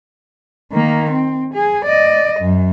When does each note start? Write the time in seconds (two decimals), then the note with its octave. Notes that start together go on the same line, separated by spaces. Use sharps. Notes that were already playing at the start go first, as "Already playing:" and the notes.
0.72 D#3 A#3
1.11 C4
1.54 G#4
1.85 D5 D#5
2.40 F#2